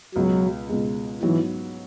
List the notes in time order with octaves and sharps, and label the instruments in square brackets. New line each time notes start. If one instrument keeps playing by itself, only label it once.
[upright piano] C#2 B2 G#3 [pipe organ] F#3
[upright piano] C#2 B2 G#3
[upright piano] G#2 F#3 B3 [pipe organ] E3